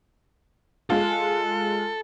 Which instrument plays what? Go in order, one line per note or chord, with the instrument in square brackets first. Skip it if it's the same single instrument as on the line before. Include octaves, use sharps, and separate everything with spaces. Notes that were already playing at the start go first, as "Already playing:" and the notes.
[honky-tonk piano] G#3 F4 [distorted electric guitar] A4